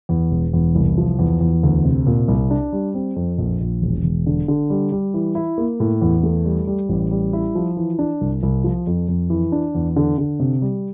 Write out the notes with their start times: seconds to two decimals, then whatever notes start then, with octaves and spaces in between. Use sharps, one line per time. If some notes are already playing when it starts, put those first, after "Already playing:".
0.09 E2
0.31 E1
0.53 E2
0.75 C2
0.98 F3
1.19 E2
1.41 E2
1.63 D2
1.85 C3
2.07 A#2
2.28 C2
2.50 D4
2.73 G3
2.95 C4
3.16 F2
3.38 A#1
3.61 A#1
3.82 E1
4.04 E1
4.26 D3
4.48 D3
4.70 G3
4.92 G3
5.14 E3
5.35 E4
5.58 A#3
5.80 A2
6.02 E2
6.23 A3
6.45 G3
6.67 G3
6.89 A1
7.11 G3
7.33 E4
7.55 F3
7.77 E3
7.99 D4
8.21 C2
8.43 C2
8.64 F3
8.87 F2
9.08 F2
9.30 E3
9.52 D4
9.75 E2
9.96 D3
10.18 D3
10.40 C3
10.62 G3